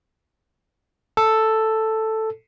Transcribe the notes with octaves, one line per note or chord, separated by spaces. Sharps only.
A4